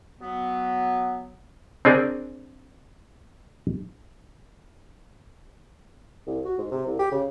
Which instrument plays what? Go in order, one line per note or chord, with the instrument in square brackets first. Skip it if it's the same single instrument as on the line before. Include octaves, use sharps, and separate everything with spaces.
[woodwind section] F#3 B3
[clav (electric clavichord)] C4 D4 G#4 A#4
[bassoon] C2
F#4
G#2
C3
C2
G4
C#3